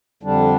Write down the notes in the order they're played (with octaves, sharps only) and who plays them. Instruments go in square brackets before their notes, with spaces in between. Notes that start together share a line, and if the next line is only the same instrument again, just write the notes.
[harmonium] F2 D3 G3 D4